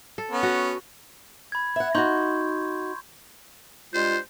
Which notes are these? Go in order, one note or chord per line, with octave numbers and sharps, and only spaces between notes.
A4
B3 C#4
F#4
B5 G#6
E5 F#5
D#4 F#4 C6 C#6 G6
G2 G#3 F4 C5